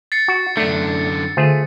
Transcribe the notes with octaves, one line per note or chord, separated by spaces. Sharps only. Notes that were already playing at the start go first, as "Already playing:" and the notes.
A6 C7 C#7
F#4
F#2 D3 A3 D4 B6 C#7
D3 A3 F4 G#4